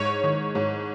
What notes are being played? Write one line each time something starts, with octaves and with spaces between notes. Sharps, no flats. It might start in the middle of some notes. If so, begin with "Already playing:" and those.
Already playing: G#2 C#5
D#3
G#2